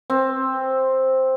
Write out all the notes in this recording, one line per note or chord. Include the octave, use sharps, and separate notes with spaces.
C4